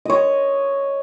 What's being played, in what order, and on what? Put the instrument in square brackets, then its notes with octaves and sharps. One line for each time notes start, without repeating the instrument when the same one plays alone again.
[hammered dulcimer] C#5 D#5